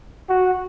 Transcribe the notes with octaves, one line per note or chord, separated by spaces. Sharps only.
F#4